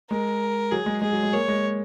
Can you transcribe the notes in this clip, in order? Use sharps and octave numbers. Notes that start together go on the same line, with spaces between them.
G#3 A#4
F#3 G#4
G#3
G#3 G#4
F#3
G#3
A#3 C#5
G#3